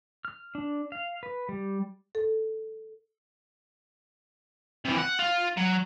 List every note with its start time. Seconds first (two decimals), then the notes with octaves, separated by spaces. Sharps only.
0.25 F6
0.55 D4
0.92 F5
1.23 B4
1.49 G3
2.15 A4
4.85 C3 E3
4.98 F#5
5.19 F4
5.57 F#3